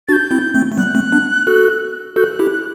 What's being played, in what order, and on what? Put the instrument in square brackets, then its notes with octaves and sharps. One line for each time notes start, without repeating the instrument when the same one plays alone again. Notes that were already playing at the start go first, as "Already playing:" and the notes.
[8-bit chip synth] D4 F#4 [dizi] A6
[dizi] G6
[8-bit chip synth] C4 E4
A3 C4
A3
[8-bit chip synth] G3 B3 [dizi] F#6
[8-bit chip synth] A3 C4
B3 D4
F#4 A4
[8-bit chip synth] F#4 A4 [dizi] G6
[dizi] F#6
[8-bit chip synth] E4 G4